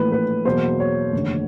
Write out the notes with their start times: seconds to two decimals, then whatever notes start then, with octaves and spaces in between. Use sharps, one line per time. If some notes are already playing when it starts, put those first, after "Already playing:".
Already playing: A#1 A2 E3 B4
0.12 B4
0.45 E2 B2 F#3 A#3 C5
0.80 C#5
1.13 F1 D#2 D3